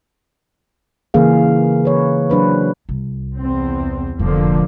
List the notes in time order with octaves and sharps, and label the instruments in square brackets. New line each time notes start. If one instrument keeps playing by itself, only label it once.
[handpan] C#3 E3 A#3 G#4 F5
B4 C#5
F#3 D4 B4 C5
[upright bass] C2
[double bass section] E2 C4
[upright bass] F1 A#2 [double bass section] D3 F3 A#3